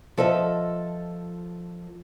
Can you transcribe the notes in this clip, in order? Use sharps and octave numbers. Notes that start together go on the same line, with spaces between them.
F3 A4 B4 D#5 E5